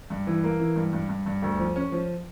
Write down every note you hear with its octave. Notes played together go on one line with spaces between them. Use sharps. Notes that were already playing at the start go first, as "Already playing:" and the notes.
G2
E3
A#3
E3
G2
G2
G2
G2
D2
F3
C#4
F3